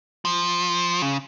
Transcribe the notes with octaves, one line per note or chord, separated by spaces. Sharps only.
F3
C#3